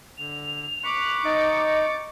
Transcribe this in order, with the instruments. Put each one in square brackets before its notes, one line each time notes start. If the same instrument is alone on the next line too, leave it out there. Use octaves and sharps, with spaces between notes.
[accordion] D3 [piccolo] F7
[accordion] B5 F#6 [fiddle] C#6 D6
[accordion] D#4 [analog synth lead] D#5 [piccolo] A6